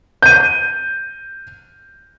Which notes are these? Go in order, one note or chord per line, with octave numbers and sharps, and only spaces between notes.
G6 D#7